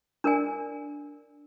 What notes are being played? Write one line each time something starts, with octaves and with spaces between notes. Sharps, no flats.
D4 A#4 D5 G#5